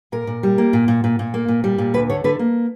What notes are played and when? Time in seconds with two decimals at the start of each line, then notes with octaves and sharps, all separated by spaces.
0.12 A#2 A#4
0.27 A#2
0.43 G3
0.58 A#3
0.73 A#2
0.88 A#2
1.04 A#2
1.19 A#2
1.34 A#3
1.48 A#2
1.64 G3
1.78 A#2
1.94 D2 B4
2.09 D3 C#5
2.24 D3 B4
2.39 A#3